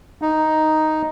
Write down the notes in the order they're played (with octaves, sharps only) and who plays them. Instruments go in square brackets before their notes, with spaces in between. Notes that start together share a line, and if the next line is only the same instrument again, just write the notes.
[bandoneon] D#4